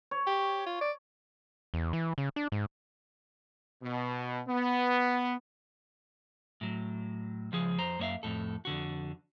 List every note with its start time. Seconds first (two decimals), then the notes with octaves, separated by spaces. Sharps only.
0.11 C#5
0.27 G4
0.66 F4
0.81 D5
1.74 E2
1.93 E3
2.18 C#3
2.36 D4
2.52 G#2
3.83 B2
4.47 B3
6.61 A2 F#3
7.52 C#2 F3 G#4
7.78 F2 C5 A#5
7.99 F#2 A#3 C#5 E5 F5
8.23 F2 A2 A4
8.65 F2 D3 F#4